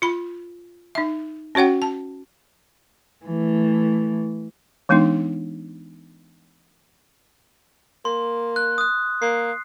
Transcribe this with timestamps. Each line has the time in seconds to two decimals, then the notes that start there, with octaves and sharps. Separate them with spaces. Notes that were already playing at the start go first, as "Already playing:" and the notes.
0.02 F4 B5
0.95 D#4 E5
1.55 C#4 F#4 C#5 F#5 G5
1.82 A5
3.26 E3 A3
4.89 E3 G#3 B3 D4 D#4
8.05 A#3 C6
8.56 F#6
8.78 D#6 F#6
9.22 A#3 C7